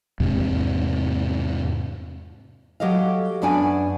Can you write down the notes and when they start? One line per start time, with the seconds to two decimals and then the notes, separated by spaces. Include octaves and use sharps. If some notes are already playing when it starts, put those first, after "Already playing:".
0.20 E2 G#2 C3
2.80 F#3 G4 A4 D#5 F5
3.42 F#2 B3 D4 F#4 G#5